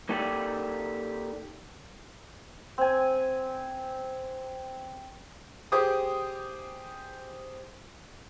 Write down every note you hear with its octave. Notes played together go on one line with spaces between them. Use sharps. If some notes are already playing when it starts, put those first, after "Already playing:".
A#3 D#4 G4 A4 D5
C4 G#5
G4 G#4 C5 D6 D#6